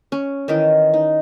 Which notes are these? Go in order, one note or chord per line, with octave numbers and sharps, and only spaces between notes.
C#4
D#3 E3 D#4 A#4
D#4